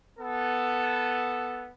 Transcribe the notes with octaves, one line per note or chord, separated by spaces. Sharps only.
B3 A4